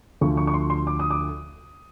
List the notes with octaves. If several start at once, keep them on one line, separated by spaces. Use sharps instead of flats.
D2 D3 F3 C#6
C#6
C#6
C6
C6
D6
D#6
D6